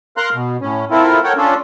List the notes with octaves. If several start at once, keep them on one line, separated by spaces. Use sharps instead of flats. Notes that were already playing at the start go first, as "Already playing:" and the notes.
A#4 F5 A#5 C6 F#6
B2
A2 C#4
C4 E4 F4 A4 A#4
A4 A#4 C#5 F#5 G5
C#4 D4 F4 A4